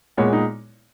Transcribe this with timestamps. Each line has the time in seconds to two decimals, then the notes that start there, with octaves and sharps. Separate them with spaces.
0.17 A#2 G#3 B3 C#5
0.33 D#4